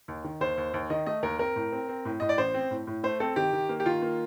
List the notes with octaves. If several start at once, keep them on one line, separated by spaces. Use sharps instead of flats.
D#2
D#3
D#2 C5
D#2
D#2
D#3 D#5
A3 D#5
D#2 A#4
C4 A#4
A2
C4
C4
A2
A2 D#5
D5
A1 C5
C4
A2
A2
A3 C5
C4 A4
D#3 G4
D#3
A#3
G4
D#3 F4
A#3